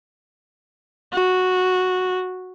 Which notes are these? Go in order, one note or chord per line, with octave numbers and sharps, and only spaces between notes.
F#4